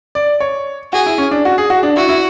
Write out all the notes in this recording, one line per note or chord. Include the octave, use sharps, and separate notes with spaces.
D5
C#5
F#4 G#4
E4
C#4
D4
F#4
G#4
F#4
D4
E4 F#4
E4